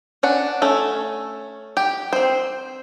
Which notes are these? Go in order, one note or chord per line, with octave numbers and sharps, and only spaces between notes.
C#4 D4 F#5
A3 C#4 A4
G4
C4 C5